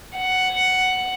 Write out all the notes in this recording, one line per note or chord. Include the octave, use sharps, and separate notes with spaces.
F#5